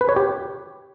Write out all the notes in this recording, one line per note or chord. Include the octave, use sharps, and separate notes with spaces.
B4
C#5
G4